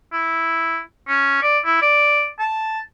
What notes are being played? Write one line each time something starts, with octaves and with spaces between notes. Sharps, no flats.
E4
C#4
D5
E4
D5
A5